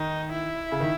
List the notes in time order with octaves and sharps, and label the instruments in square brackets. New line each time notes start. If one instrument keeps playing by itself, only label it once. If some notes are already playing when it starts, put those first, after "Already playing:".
Already playing: [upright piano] D#3 [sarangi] D#4
[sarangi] E4
[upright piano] C#3
D#3